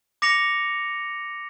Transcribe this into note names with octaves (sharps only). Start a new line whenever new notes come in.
D6 A#6 C#7 F7